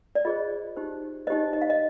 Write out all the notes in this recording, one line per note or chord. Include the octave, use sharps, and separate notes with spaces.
D5
F4 G#4 C5 D#5
D#4 G4 C5
D#4 G4 C5 D#5
D#5
F5
D#5